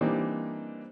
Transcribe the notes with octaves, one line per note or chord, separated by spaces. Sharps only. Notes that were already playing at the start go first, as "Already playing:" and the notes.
E3 G3 A#3 C4 D4 D#4